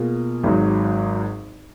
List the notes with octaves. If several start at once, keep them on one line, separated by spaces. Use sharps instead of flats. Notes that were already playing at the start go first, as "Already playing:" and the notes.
Already playing: B2 A#3 F4 G#4
G#1 G#2 F#3